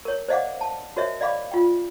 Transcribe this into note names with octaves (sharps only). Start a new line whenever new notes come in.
A#4 C#5
C5 D5 D#5 F5 F#5 D6
A5
F#4 A#4 C5 C#5 D#5 E5
D5 D#5 F5 B5 D6
F4 G5